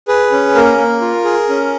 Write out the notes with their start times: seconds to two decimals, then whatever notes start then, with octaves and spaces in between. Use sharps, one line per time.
0.08 G#4 B4
0.32 C#4
0.55 A#3 A#4
0.78 A#3
1.01 F4
1.24 G#4
1.49 C#4